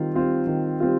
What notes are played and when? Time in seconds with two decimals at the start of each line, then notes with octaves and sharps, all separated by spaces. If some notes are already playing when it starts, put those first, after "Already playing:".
Already playing: D#3 G3 C4 F4
0.14 G3 C4 F4
0.47 D#3
0.80 G3 C4 F4